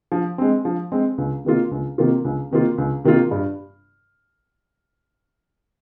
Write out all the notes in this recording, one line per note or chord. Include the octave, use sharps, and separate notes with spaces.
F3
G#3 C4
F3
G#3 C4
C#2
C3 D#3 A#3 F4
C#2
C3 D#3 A#3 F4
C#2
C3 D#3 A#3 F4
C#2
C3 D#3 A#3 F4
G2